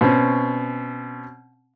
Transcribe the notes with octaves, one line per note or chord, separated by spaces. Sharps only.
B2 C4 C#4